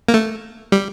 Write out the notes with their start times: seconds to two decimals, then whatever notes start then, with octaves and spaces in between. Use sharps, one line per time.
0.08 A#3
0.14 A3
0.72 G3